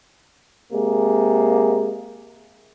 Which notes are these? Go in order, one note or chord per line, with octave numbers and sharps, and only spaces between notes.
C3 G#3 A#3